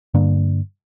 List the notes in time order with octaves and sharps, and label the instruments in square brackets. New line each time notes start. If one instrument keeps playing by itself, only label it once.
[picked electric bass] G2 D3 A#3 D4